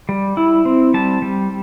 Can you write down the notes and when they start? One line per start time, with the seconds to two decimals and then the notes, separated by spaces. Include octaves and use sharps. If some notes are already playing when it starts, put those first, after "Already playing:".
0.09 G3
0.37 E4
0.65 C4
0.94 G3 A5
1.22 G3